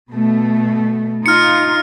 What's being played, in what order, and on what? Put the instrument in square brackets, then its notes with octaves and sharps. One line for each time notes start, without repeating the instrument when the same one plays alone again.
[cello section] B2 A3
[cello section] D#4 F4 [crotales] F6 C#7